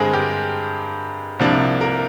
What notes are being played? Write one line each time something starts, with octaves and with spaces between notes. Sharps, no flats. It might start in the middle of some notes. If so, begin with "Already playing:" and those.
Already playing: G2 D3 G#3 C4 G#4 A#4
G4
C2 C3 F3 A#3 D4
A#4